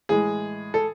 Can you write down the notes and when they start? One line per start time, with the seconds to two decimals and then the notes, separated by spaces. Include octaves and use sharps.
0.09 A2 E3 G#3 G#4
0.74 A4